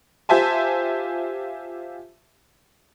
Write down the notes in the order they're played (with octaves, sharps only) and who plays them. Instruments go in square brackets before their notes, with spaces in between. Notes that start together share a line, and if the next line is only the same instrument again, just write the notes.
[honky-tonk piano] F4 G4 C5 E5 G#5 A5